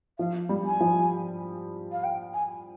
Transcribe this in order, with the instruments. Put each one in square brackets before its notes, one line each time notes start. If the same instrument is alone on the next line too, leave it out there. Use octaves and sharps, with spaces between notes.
[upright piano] F3 [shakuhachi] F5
[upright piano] G3
[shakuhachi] G#5
[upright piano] F3
[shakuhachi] F5
G5
G#5